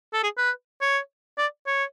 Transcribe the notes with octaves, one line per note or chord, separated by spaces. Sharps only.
A4
G#4
B4
C#5
D5
C#5